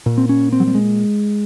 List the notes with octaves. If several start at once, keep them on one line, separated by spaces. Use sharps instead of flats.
A#2
C4
C#4
C4
F#3
G3
G#3